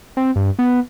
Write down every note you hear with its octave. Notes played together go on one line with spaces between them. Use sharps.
C4
G2
B3